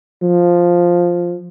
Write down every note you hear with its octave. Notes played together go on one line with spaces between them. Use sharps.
F3